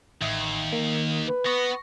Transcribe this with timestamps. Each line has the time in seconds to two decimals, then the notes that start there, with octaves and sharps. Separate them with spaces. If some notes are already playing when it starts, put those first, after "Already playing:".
0.22 A1 D#2 E5
0.73 D#3 A#3
1.28 B4
1.46 B3 C#6 A#6